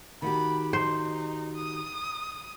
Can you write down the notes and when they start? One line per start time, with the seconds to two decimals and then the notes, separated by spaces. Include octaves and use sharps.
0.22 D#3 F#4 G4 B5
0.73 D#4 C5
1.56 D#6